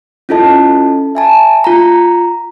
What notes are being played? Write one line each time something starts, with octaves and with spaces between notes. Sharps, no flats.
C#4 E4 F4 A4 D#5 A5
E5 G#5 A5
F4 A#5